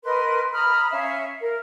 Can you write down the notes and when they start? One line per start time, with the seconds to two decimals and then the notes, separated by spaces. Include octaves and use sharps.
0.04 A#4 B4 D#5 C6
0.53 A#5 B5 D#6 F6
0.91 C#4 E5 F5
1.39 A#4